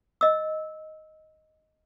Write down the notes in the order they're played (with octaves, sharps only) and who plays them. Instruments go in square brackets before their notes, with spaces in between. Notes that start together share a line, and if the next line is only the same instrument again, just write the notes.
[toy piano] D#5 E6